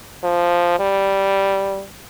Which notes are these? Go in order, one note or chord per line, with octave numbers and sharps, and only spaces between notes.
F3
G3